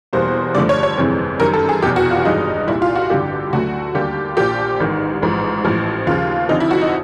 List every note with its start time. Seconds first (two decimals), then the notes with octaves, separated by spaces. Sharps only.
0.13 E2 B2 G3 A#3 C5
0.55 G2 D3 F3 A3 D5
0.69 C#5
0.83 C#5
0.98 G1 F2 C3 E3 G#3
1.40 F#2 D#3 G3 A#4
1.54 A4
1.69 G#4
1.82 F1 E2 B2 G4
1.96 F#4
2.11 F4
2.25 G#1 G2 E3 G#3 D#4
2.67 C2 A#2 G3 E4
2.82 F4
2.96 F#4
3.10 A1 G2 D3 G4
3.53 D2 D3 F#3 A3 F#4
3.94 D#2 D3 G3 A#3 G4
4.37 A#1 A#2 F3 G4
4.80 A1 G#2 D#3
5.22 A1 G#2 F3
5.64 A1 A2 F3
6.07 D#2 C#3 F3 F4
6.49 F1 F2 D3 F3 D#4
6.60 E4
6.71 F#4
6.81 D#4